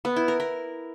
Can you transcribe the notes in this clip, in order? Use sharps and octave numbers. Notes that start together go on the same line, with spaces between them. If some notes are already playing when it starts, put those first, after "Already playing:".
B3
E4
A#4
A#4